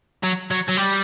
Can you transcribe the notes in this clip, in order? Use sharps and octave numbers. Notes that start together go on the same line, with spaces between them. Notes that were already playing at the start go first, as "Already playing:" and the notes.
F#3
F#3
F#3
G3